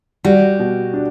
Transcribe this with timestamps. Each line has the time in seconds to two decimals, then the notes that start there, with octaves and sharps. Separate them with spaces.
0.25 G3 F#4
0.59 B2
0.94 D4